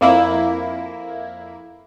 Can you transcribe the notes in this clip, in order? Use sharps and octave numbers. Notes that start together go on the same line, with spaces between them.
F2 A#3 E4